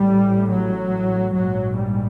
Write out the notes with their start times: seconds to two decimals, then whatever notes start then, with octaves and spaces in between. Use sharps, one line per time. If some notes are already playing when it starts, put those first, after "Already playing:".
Already playing: A1 A2 G3
0.50 F#3
1.35 A#1 G#2 F#3
1.77 G3